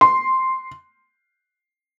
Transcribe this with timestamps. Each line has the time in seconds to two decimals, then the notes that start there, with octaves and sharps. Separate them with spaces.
0.01 C6